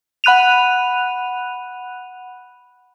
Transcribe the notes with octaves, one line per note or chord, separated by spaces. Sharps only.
F#5 B5 F#6 D#7 F7